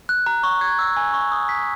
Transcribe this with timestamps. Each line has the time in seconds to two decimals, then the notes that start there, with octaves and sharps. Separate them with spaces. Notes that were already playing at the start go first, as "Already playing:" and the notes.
0.09 F#6
0.26 A#5
0.43 C#6
0.61 G#6
0.79 E6
0.97 G#5
1.13 C#6
1.32 D#6
1.49 B6